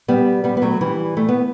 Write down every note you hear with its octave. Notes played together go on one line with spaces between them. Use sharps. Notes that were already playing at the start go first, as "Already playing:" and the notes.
G3 B3
G3 B3
B3
F#3 A3
E3 G3
A3
B3